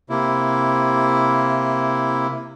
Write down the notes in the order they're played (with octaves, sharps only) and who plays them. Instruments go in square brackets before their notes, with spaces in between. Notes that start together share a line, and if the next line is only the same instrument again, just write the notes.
[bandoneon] C3 A#3 E4